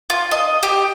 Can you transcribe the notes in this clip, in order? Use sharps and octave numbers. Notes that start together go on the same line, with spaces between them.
F4
D#5
G4